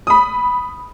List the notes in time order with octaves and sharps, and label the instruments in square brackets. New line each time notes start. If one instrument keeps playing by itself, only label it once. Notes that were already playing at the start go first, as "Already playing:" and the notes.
[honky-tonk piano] B5 D#6